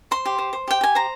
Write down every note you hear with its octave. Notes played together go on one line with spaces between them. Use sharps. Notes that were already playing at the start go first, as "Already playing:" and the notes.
C5 C6
G4
C5
C5
G4 G5
G4 G#5
C5 A#5